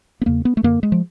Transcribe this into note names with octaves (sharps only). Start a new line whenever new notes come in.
B3
E2 C#3 A#3
B3
A3
F#2 D3 A#3
G#3
F3